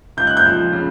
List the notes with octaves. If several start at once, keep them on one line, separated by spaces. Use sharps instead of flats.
C#2 G6
F#6
G6
F3
C#3